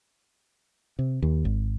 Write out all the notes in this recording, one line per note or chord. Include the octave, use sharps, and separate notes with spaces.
C3
D#2
G#1